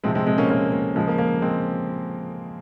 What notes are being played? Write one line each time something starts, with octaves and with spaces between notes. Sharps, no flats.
C3 F3 G#3 C4
G#3 C4
G#3 C4
A#3 C#4
A#3 C#4
A#3
C#3 F3 G#3
A#3
A#3
G#3 C4